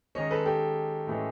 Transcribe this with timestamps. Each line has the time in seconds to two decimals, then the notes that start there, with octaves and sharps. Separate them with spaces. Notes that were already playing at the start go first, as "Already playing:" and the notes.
0.15 D#3 G#3 C#4 C#5 D#5
0.31 A4 B4
0.45 G4 A4
1.07 A2 E3 G#3 C#4